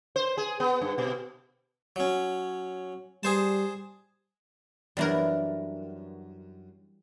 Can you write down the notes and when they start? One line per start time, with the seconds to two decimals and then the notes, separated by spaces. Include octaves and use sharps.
0.16 C5
0.37 G#4
0.60 B3
0.82 G2
0.98 B2
1.96 F#3 C#4
3.23 G3 G#4 C5 A5
4.97 F#2 E3 G3 D4 A#4